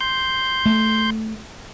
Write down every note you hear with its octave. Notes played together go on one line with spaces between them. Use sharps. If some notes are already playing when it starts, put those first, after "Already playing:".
C6 G6
A3